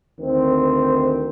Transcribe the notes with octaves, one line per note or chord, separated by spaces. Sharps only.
D2 D#3 C4